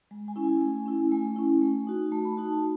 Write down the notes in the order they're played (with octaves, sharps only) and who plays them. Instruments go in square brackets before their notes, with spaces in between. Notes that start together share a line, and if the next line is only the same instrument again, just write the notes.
[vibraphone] G#3
G#5
C#4 E4
G#5
A3
C#4 E4
A3 G#5
C#4 E4
A3
D#4 F#4
A3 A5
B5
D#4 F#4 A5